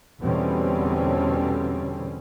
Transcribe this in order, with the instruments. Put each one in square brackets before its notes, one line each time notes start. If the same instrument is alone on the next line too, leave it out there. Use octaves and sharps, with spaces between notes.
[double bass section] E2 B2 D3 G3 C4 C#4